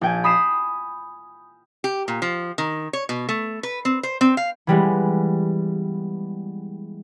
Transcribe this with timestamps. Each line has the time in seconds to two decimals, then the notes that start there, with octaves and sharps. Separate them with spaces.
0.01 A#1 G5 G#5
0.24 B5 D#6 B6 C7 E7
1.84 G4
2.08 A#2
2.22 F3
2.58 D#3
2.93 C#5
3.09 B2
3.29 A3
3.63 B4
3.85 C4
4.03 C5
4.21 C4
4.37 F5
4.67 E3 G3 G#3 B3